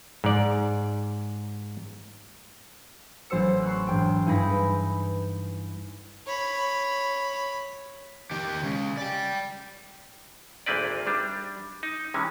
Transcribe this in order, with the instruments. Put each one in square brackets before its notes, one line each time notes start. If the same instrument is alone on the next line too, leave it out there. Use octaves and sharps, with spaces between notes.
[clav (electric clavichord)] G#2 D5
[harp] A1 F#3 C5 E6 C#7
C6 C#6 E6 F#6
E1 G#2 G5 D7
G2 D#4 E4 G#4 B5 A#6
B4
[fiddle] C#5 B5
[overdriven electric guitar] D#3 G4
C#3 G#3
D5 G5
[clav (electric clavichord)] G#1 D2 A#3 C4 B4 D5
G3 D4
D#4
C3 E3 G#3 C#4